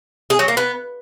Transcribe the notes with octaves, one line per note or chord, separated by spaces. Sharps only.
G#4
F#3
A#3
B3